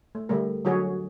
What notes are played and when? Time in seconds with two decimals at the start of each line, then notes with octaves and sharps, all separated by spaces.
0.15 A3
0.29 D3 G3 A3 A#4
0.65 D3 F#3 F#4 G#4 C#5